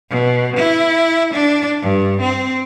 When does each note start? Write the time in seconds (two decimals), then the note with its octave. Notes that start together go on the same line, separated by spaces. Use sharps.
0.11 B2
0.56 E4
1.34 D4
1.82 G2
2.21 C4